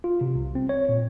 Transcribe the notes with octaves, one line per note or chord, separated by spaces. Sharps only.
F4
C3
C2
C4
C#5
A#2